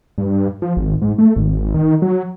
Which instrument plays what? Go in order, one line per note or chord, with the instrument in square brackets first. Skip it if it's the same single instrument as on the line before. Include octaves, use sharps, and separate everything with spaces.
[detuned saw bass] G2
F3
G#1
G#2
A3
G#1
D#3
F#3